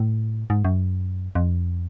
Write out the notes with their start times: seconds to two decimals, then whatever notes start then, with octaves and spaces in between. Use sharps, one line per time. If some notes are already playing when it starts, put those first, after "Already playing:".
Already playing: A2
0.50 G#2
0.65 F#2
1.35 F2